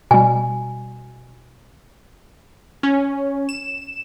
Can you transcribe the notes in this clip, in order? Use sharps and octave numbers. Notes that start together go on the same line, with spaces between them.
B2 G3 G#5
C#4
E7